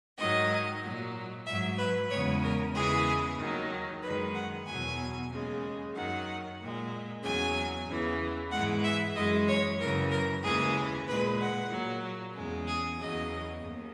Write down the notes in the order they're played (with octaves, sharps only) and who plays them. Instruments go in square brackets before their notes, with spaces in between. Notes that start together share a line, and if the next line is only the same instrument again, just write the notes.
[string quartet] G#2 D#3 F#3 D#5
A#2 F#3
G#2 F#3 E5
B4
E2 C#3 G#3 C#5
A#4
E2 C#3 E3 G#3 G#4
D#2 D#3 F#3
F#2 D#3 G#3 B4
F#5
E2 B2 F#3 G#5
D#2 C#3 G#3
F#2 D#3 F#3 F#5
A#2 G#3
E2 C#3 F#3 G#5
E2 C#3 E3
G#2 E3 G#3 F#5
E5
F#2 E3 G#3 D#5
C#5
F#2 C#3 E3 A#4
A#4
D#2 C#3 E3 G#3 G#4
A#2 G#3 B4
F#5
A#2 F#3
E2 C#3 G#3
G#4
E2 C#3 F#3 D#5
D#2